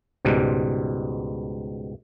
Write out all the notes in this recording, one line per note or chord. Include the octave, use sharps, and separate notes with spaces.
C#2 G#2 B2 G3